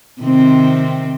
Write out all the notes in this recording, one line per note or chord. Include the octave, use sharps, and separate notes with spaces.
C3 D#3 C4